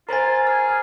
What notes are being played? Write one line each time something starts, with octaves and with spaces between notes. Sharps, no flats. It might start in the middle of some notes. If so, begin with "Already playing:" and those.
F4 A#4 C5 G#5 A#5 A6
G#4 F6